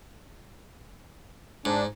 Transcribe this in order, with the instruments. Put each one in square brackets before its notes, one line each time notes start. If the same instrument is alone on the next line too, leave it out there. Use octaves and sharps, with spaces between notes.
[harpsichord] G#2 [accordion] D4